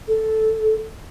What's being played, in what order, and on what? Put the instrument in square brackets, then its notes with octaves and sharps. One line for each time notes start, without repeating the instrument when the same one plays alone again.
[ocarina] A4